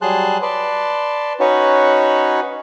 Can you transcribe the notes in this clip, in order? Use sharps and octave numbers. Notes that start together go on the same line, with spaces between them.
F#3 G3 G#4 A5 C6 F#6
B4 D5 A5 C6
C#4 D#4 F#4 B4 C#5